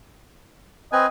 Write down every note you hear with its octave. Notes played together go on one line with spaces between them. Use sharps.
C4 B4 D#5 G#5